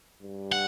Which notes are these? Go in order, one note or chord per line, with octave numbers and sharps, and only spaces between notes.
G2
F#5